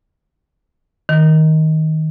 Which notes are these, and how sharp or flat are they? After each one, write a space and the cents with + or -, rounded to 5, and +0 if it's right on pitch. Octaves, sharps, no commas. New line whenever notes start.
D#3 +15